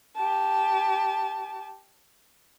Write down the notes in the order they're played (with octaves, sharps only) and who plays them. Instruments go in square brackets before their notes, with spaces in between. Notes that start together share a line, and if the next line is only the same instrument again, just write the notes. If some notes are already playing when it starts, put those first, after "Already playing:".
[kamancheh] G4 A5